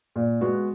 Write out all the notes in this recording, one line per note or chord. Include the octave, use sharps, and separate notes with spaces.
A#2
G#3 B3 F#4